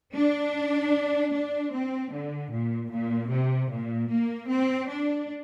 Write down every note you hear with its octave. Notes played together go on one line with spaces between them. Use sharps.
D4
D4
C4
D3
A#2
A#2
C3
A#2
A#3
C4
D4